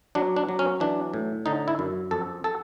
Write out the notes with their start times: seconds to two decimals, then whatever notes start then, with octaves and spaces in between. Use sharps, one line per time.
0.15 F#3 D4
0.36 D4
0.49 F#3
0.59 C#4
0.80 E3 D4
1.14 A2
1.46 D3 D#4
1.68 E4
1.79 F#2
2.11 F2 A4
2.44 A4